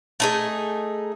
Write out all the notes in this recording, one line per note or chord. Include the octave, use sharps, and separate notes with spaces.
A3 D#4 G#4